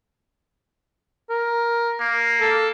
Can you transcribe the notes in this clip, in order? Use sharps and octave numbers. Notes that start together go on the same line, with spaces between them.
A#4
A#3
A4